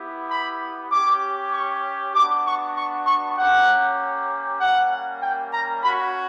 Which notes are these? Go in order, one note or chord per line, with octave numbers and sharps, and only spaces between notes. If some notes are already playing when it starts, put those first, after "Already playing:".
Already playing: B3 E4 G4
B5
C#4 G4 D6
C#6
B3 D4 F#4 D6
C#6
C#6
C#6
A#3 C#4 G4 F#5
G3 A#3 C#4 F#5
G5
A#5
C#4 F#4 B5